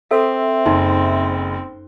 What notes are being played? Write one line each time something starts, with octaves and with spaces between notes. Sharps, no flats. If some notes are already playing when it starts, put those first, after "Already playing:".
C4 A4 C5 E5
F#1 D#4 C6